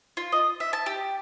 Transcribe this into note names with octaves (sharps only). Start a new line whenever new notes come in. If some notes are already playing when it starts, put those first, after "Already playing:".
F4
D#5
E5
A5
G4